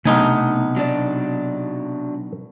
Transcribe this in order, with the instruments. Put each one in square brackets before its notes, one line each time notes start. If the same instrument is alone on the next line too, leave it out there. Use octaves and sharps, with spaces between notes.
[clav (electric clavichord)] B1 D#4 G#5 [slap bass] C3 [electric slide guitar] A3 D4
[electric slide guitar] F#3 D4 D5